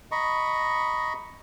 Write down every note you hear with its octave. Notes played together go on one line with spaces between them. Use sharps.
D#5 A#5 B5 C#6